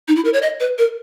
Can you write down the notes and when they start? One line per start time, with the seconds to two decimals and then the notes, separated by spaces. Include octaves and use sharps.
0.08 D#4
0.16 E4
0.25 A#4
0.34 C#5
0.42 D#5
0.60 B4
0.78 A#4